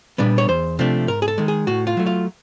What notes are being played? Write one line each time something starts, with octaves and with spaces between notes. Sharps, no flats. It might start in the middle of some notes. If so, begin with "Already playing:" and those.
A#2 G3 B3 D4
C#5
E2 C5
C3 F3 A3 D4
G#2 A#4
G#4
A4
D#3 G#3
G#4
A2 F#4
F4
F#3 A3
F4